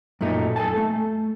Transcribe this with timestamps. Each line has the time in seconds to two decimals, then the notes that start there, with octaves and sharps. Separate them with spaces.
0.21 F#2 A#2 A3 D#4
0.56 A4 G#5 A5
0.77 A3